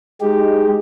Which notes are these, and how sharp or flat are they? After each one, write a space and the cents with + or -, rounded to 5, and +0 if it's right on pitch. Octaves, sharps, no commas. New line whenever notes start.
G#3 +0 D#4 -5 G4 +0